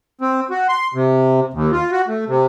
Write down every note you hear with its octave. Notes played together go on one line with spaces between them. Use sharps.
C4
F#4
C6
C3
D#2
F4
F#4
A3
C3